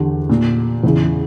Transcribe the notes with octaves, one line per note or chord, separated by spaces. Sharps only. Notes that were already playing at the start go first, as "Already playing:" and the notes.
Already playing: E2 D3 G4
A#2
E2 C#3 E3